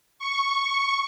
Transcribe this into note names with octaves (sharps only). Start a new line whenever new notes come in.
C#6